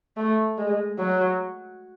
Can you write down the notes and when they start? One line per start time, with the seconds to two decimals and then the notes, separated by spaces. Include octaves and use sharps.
0.17 A3
0.58 G#3
0.99 F#3